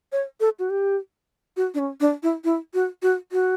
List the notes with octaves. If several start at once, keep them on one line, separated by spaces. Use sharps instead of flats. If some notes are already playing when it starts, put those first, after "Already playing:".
C#5
A4
F#4
G4
F#4
D4
C#4
D4
E4
E4
F#4
F#4
F#4